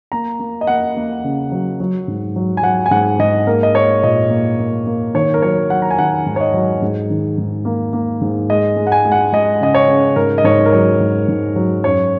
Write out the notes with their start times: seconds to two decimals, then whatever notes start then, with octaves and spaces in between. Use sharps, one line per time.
0.12 A#3 A#5
0.39 A#3
0.61 D#5
0.67 A#3 F#5
0.96 A#3
1.24 C#3
1.52 F#3
1.80 F#3
2.08 G#2
2.36 F#3
2.57 G#5
2.63 F#3 F#5
2.86 G#5
2.91 G#2 F#5
3.19 G#2 D#5
3.47 A#3 A#4
3.63 D#5
3.74 A#3 C#5
4.03 A#2 D#5
4.30 A#3
4.59 A#3
4.86 A#3
5.14 D#3 C#5
5.34 A#4
5.42 F#3 C#5
5.70 F#3 F#5
5.82 A#5
5.90 G#5
5.98 D#3 F#5
6.26 G#2
6.36 C#5
6.41 D#5
6.54 F#3
6.82 G#2
7.10 D#3
7.38 G#2
7.65 A#3
7.93 A#3
8.21 G#2
8.50 G#3 D#5
8.77 G#3
8.87 F#5
8.92 G#5
9.05 G#3
9.12 F#5
9.32 G#3 D#5
9.61 C#3 D#5
9.74 C#5
9.88 C#3
10.16 G#2 A#4
10.38 D#5
10.44 G#2 C#5
10.66 A#4
10.73 F#3 C#5
11.00 G#2
11.28 G#2
11.56 F#3
11.84 F#2 C#5